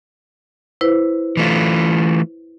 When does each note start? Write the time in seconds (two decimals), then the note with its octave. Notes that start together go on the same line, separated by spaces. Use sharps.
0.81 E4 B4 C5
1.37 E3 A3 F4